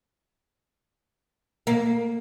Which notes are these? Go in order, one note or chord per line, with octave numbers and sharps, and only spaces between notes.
A#3